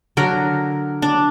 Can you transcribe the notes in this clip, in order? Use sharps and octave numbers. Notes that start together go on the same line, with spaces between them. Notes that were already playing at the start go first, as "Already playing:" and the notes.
D3 F#3 A#4
D4